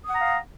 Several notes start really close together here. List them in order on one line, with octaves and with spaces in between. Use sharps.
D#6 F#5 A#5 F5